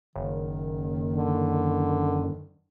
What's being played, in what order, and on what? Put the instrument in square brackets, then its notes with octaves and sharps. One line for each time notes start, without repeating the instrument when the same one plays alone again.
[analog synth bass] F#1 [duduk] D#3
[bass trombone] D3